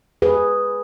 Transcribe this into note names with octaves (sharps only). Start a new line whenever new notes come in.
G#4 B4